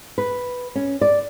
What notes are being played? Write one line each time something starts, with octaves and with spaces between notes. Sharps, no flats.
B4
C#4
D5